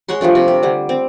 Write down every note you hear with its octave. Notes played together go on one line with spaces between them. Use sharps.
G#3 C#5 F#5 C6
F3 G3 A3 D4
C3
G4
D3 G3
C4